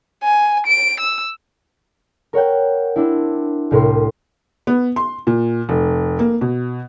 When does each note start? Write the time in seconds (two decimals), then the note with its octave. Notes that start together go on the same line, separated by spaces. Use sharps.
0.23 G#5
0.67 D7
1.00 E6
2.33 A#4 C#5 F#5 G5
2.96 C4 D4 E4
3.71 C2 A2 A#4 C6
4.67 B3
4.96 C6
5.27 A#2
5.69 F1
6.19 A#3
6.41 B2